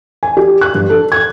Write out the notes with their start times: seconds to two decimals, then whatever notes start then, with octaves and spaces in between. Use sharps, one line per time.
0.23 G#5
0.37 G4
0.61 F#6
0.75 G2
0.90 A4
1.12 G#6